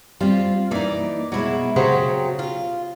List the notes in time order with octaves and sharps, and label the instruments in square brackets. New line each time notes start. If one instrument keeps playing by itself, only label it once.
[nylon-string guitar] G3 C4 [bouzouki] F4
[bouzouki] E3 D5 [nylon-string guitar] A#3 D#4
[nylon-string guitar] B2 G#3 [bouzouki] F#3 E4
[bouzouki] C#3 F#3 C4 [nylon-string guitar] G4 C#5
[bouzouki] F4